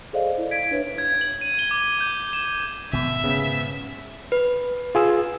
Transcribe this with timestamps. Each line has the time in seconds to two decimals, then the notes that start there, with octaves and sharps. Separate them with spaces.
0.13 G#4 A4 C5 D5 D#5 F5
0.38 E4
0.51 F5 G#6 B6 D7
0.71 D4 B4 C#5 E5
0.98 G#6
1.21 F#7
1.41 D#7
1.59 G7
1.71 D6
2.00 G6
2.33 E7
2.93 G#1 B2 B3 E5
3.24 G#2 C#3 B3
4.32 B4
4.95 F4 G#4 E6